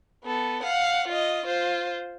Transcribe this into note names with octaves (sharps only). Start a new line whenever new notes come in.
B3 A4
F5 F#5
F4 D#5
F4 C5